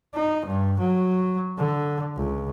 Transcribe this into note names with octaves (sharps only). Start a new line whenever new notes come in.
D#4
G2
F#3
D3
C#2